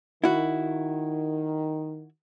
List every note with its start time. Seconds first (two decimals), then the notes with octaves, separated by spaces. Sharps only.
0.24 D#3 E4 F#4